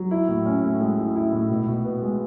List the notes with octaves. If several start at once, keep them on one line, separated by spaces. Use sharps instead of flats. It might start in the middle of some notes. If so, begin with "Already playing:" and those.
Already playing: F#3
E4
A2
C#4
A2
G#3
E4
E4
A2
B2
B2
B3
G#3